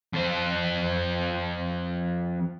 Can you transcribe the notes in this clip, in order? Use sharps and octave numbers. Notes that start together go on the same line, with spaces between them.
F2 C5